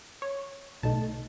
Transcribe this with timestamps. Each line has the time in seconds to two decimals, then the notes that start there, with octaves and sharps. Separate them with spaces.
0.22 C#5
0.82 B1 B2 A3 D#4 A5